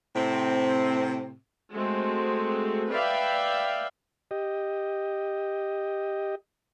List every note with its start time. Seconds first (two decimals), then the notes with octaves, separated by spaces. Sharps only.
0.15 A2 C3 C4
1.72 G#3 A3 C4 F#4
2.90 B4 D5 E5 F5 G5 B5
4.31 G4 D#5